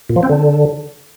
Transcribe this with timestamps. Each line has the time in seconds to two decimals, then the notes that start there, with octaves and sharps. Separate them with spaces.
0.09 A#2
0.16 F3
0.23 C4
0.29 D3